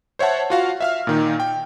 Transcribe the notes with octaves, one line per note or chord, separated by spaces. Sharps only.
C5 C#5 E5 F#5 A5
F4 F#4 F5
E5 F5 F6
A#2 D#3 D#4
G5